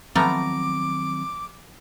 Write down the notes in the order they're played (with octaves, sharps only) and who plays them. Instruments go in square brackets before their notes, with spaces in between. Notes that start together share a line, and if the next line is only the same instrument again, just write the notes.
[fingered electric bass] D#3 F#3 C4 [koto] F3 A3 B3 [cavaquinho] A#5 [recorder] D6